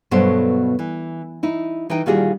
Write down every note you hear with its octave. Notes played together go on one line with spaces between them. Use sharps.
G2 B2 F#3 A3 B3 C5
E3
D#4 E4
E3 D#4 E4 G5
A#2 D#3 G3 F4 F#4 G#4